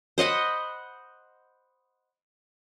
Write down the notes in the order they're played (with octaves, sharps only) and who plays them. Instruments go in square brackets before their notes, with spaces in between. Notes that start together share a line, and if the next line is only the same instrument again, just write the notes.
[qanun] C5 D#5 F#5 B5